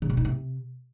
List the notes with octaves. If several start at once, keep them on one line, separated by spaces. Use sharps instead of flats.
C#3
B2
D#4
C3